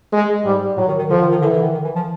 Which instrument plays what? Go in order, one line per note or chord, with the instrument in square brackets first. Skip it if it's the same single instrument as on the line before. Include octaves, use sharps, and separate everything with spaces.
[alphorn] G#3
[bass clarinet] G#2 [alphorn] G3
[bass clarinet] A2 [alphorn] F#3
[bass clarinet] D#3
D#3
[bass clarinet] D3 [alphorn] F3
[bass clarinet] D#3
D#3
[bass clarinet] D3 [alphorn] E3
[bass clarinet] D3
D#3
D#3
E3
F3